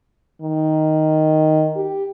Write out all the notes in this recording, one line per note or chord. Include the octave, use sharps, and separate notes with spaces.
D#3
G4